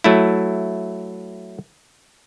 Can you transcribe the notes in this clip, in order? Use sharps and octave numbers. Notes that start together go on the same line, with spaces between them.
F#3 A3 E4